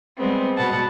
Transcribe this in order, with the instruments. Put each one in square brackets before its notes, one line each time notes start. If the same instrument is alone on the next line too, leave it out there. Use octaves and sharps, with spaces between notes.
[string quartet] G3 G#3 B3 C4
B2 B3 F#5 A5